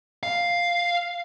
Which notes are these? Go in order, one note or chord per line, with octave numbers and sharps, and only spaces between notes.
F5